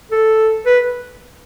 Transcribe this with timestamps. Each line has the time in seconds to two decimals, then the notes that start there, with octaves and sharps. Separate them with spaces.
0.11 A4
0.66 B4